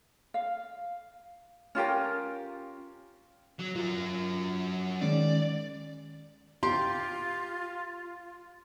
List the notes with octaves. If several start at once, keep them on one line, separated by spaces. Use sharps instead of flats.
F5
C#4 F4 G4 A#4
F#3
F#3 F4 A#4
D#3 G#3 C#4 D5
F4 G4 C6